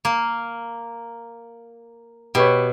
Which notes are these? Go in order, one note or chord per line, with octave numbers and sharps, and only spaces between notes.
A#3
B2 G4 B4 C#5